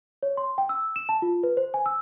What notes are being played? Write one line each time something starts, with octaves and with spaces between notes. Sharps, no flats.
C#5
C6
G5
E6
E7
A5
F4
B4
C5
G#5
E6